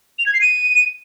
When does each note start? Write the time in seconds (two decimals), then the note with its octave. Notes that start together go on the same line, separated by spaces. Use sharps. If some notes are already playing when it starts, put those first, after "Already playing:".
0.19 F7
0.26 G#6
0.34 C7
0.41 D#7